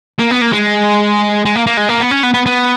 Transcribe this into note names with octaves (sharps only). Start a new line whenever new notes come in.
A#3
B3
A#3
G#3
G#3
A#3
A#3
G#3
A#3
B3
C#4
B3
B3
B3